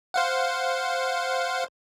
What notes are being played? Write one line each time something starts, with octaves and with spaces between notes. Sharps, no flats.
C5 F5 F#5